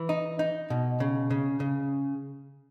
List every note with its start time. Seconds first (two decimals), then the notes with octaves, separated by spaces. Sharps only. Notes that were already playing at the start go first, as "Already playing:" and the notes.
Already playing: E3
0.09 D#4
0.39 D#4
0.70 B2
1.00 C#3
1.30 C#3
1.60 C#3